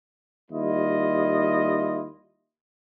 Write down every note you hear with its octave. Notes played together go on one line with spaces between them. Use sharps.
D#2 G3 E4 F4 D#5